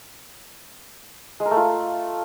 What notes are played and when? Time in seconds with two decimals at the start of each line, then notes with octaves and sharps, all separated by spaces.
1.40 G#3
1.46 A#4
1.51 A3
1.57 F4